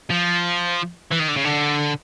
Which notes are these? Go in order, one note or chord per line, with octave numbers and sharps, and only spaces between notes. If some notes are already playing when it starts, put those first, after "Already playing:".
F3
E3
D#3
D3
C#3
D3